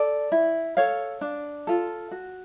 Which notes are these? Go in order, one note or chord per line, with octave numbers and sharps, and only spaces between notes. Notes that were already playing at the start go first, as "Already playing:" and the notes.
Already playing: A4 D5
E4
A4 C#5 F5
D4
F4 A4
F#4